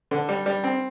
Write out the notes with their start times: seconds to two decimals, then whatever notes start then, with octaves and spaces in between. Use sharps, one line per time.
0.11 D3
0.29 G3
0.46 G3
0.64 C4